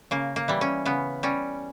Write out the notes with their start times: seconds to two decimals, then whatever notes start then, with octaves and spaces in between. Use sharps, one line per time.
0.11 C#3 A#3
0.36 A#3
0.48 E3 G3
0.61 C#4
0.86 C#3 B3
1.23 G3 C#4